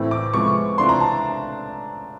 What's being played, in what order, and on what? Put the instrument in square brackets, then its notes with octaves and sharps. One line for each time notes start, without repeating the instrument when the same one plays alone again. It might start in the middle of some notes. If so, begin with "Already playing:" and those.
Already playing: [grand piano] A2 E3 A3 C4
D6
C3 F3 G#3 B3 C#6
C3 E3 A3 D4 F4 C6
A#5
A5